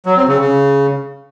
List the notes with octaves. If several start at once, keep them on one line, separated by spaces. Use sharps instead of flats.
F#3
C4
C#3
C#3